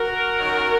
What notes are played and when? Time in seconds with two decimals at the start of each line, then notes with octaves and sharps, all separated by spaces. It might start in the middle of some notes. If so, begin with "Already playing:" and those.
Already playing: F#4 A#4
0.39 F#2 D#3 F#3